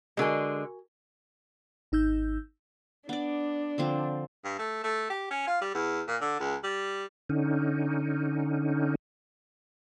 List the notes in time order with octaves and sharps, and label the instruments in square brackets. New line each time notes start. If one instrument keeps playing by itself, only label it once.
[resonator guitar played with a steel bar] D3 G#3 [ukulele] F#4 A#4 G#5
[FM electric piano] G#1 D#4 E6 G6
[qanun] B3 D5 [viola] D4
[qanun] D3 F3 C4
[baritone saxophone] G2
A3
A3
G4
C#4
F4
G3
E2
A#2
D3
C#2
G3
[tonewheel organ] D3 C#4 D#4